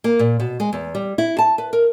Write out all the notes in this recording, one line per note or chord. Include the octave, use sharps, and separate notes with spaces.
A#3
A#2
B2
G#3
E2
G3
E4
A5
B4
A#4